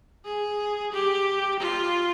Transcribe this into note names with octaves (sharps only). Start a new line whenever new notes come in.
G#4
G4
F4